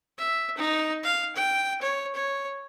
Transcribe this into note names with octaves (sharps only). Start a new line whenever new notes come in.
E5
D#4
F5
G5
C#5
C#5